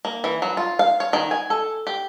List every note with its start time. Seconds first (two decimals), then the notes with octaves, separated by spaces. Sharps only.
0.05 A#3
0.24 E3
0.42 F#3
0.57 F4
0.79 F5
1.00 C#5
1.13 D#3
1.31 G#5
1.50 A4
1.87 G4